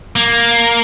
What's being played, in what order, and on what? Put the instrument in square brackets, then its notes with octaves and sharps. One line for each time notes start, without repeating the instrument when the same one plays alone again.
[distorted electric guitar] A#3